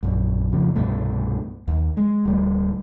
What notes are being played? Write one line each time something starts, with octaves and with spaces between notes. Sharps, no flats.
A#1 F#2
F2 C#3 F3
C2 G2 B2 A3
D#2
G#3
D1 G3 A3